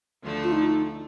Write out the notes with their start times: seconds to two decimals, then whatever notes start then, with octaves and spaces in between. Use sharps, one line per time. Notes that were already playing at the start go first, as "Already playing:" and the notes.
0.22 D2 D3 F3 A3
0.44 F4
0.52 D#4